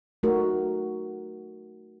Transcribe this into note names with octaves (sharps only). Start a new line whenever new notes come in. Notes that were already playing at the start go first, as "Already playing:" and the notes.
A3 D#4 F#4 A#4